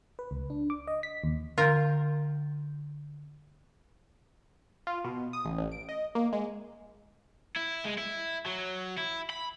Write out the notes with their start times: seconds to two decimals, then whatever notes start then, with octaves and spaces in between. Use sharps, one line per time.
0.19 B4
0.31 C#2
0.50 D4
0.70 D6
0.87 D#5
1.03 B6
1.24 D#2
1.58 D3 F4 A#4 G6
4.87 F4
5.04 B2
5.33 D#6
5.45 A1
5.58 A1
5.72 D7
5.89 D#5
6.15 A#3
6.33 G#3
7.56 E4
7.85 G#3
7.98 E4
8.46 F#3
8.98 E4
9.30 B5